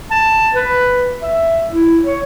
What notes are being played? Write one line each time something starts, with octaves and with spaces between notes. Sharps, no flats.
A5
B4
E5
E4
C#5